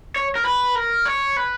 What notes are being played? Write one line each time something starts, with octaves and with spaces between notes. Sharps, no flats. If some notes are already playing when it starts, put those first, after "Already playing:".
C#5
A#4
B4
A#4
C#5
B4